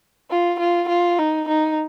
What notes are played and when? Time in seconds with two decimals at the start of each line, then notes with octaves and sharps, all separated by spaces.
0.31 F4
0.60 F4
0.89 F4
1.19 D#4
1.48 D#4